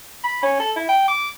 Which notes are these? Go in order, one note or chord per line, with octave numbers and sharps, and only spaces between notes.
B5
C#4
A4
E4
G5
D6